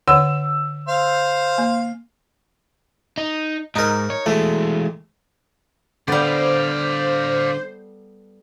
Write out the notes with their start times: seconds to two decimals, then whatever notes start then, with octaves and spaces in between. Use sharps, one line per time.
0.08 D3 C#5 F#5 E6
0.89 C5 F5
1.58 A#3
3.18 D#4
3.76 G#2 D#4 A#4
4.10 C#5
4.26 E3 G#3 A3
6.08 D3 G3 B3 C5 D5 F5